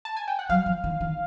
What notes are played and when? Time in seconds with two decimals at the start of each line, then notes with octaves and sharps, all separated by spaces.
0.05 A5
0.17 G#5
0.28 G5
0.39 F#5
0.49 F#3 F5
0.66 F3
0.84 D#3
1.01 D#3